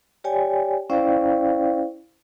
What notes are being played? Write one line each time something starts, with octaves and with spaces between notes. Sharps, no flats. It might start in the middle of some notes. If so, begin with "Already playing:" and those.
G4 C#5 D5 G5 G#5
C#4 E4 C5 D5 F5 G5